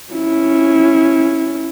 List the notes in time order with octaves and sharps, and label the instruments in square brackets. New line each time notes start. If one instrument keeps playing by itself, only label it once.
[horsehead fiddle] C#4 E4